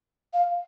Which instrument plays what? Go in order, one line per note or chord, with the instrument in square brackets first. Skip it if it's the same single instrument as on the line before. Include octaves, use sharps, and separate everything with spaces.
[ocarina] F5